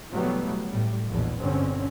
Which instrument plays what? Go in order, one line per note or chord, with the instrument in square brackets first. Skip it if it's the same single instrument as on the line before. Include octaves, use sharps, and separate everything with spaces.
[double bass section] B2 E3 F#3 G3 A3 B3
A2 G3
A#1 E2 B2
G1 G#2 B2 D3 C4 C#4